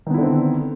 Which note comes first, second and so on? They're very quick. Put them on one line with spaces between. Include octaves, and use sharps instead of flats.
D#3 B3 E4 D3 C4